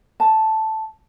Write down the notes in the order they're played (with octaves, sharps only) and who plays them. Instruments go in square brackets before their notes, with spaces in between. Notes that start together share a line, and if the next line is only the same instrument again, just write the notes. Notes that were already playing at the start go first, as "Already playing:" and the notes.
[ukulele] A5